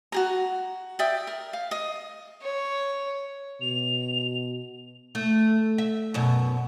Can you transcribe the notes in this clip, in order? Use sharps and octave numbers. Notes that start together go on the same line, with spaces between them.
F#4 G#4 A#5
D5 E5 G5 D#6
A#4
F5
D#5
C#5
B2 F7
A3
E5
F#2 B2